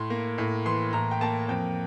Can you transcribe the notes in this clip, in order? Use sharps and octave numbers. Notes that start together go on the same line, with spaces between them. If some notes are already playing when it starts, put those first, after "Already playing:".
Already playing: A2 C6
A#3
A2
E3 C6
A2 A#5
G5
A#3 A5
F2 G5